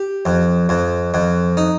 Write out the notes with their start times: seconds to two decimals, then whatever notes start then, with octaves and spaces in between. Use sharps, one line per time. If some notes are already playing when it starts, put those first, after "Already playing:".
Already playing: G4
0.25 F2
0.69 F2
1.14 F2
1.57 D#4